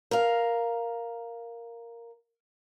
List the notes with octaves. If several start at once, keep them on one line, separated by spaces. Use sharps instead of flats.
A#4 F5